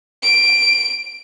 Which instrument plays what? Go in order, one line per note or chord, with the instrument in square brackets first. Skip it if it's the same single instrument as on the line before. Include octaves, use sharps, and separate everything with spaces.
[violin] D7